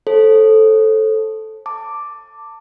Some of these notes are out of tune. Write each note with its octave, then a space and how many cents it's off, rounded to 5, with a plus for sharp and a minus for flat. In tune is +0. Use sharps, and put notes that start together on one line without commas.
A4 -5 C5 +40
A5 +25 D6 +0